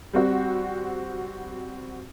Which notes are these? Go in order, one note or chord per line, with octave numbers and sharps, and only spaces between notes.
G3 C4 F#4